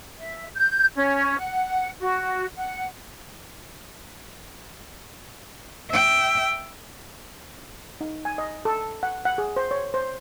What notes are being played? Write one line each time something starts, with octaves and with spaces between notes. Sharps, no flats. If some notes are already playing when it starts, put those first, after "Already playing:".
E5
G6
C#4
F#5
F#4
F#5
E5 G5
D#4
G#5
D#5
A4
F#5
F#5
G#4
C5
C#5
C5